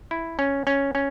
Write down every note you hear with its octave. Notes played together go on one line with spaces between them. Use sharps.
E4
C#4
C#4
C#4